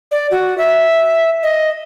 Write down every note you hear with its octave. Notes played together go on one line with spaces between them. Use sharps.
D5
F#4
E5
D#5